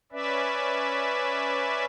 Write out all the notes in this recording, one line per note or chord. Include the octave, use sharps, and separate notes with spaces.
C#4 B4 D5 E5